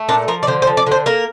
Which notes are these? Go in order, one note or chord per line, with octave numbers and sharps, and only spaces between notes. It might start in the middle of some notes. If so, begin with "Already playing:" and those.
Already playing: A3
A#2 D4
F3 A#4
D5
D3 C5
C5
F3
D5
D3
C5
A#3 A#4